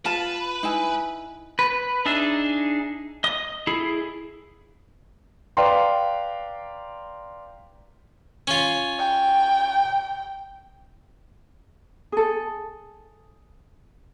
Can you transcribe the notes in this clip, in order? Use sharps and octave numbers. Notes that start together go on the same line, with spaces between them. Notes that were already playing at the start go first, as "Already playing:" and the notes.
F4 B4 A5
D#4 E4 G#5
B4
D4 D#4 G#4 E5
D#5 D#6
E4 G#4 A4
B4 D5 F5 G5 A#5 C6
C#4 F4
G5
G#4 A4